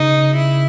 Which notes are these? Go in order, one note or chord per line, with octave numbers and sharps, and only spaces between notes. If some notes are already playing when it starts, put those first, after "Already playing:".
Already playing: C#3 D#4
E4